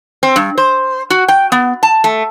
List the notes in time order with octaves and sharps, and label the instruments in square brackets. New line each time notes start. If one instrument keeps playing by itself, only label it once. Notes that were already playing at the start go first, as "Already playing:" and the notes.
[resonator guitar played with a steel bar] C4
G2
C5
F#4
G5
B3
A5
A3